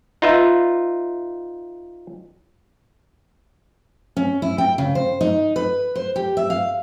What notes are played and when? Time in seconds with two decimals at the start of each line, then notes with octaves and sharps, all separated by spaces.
0.22 D#4 F4 B4 E5
4.17 C#4
4.42 E4
4.58 G5
4.78 C#3
4.95 C5
5.21 D#4
5.56 B4
5.95 C5
6.16 G4
6.37 E5
6.50 F5